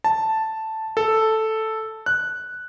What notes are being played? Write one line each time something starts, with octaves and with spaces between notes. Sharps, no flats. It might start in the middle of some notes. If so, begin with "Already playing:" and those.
A5
A4
F#6